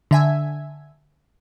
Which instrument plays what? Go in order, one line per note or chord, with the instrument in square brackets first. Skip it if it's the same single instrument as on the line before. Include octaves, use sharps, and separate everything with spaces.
[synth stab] D3 E5 G#5